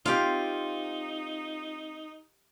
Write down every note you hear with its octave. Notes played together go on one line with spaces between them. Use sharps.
C4 D#4 F4 G4 F5